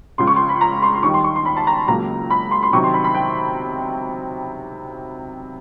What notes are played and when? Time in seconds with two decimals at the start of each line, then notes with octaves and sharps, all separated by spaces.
0.18 C#2 C#3 F3 C6
0.27 C#6
0.36 C6
0.49 B5
0.61 A#5
0.82 C6
0.94 C6
1.03 D#2 D#3 G3 C#6
1.14 C6
1.24 C#6
1.36 C6
1.45 B5
1.56 A5
1.67 A#5
1.88 C#2 C#3 F#3 A#3 A#5
2.30 B5
2.51 C6
2.63 C6
2.73 C3 D#3 F#3 C#6
2.84 C6
2.94 B5
3.04 B5
3.15 G5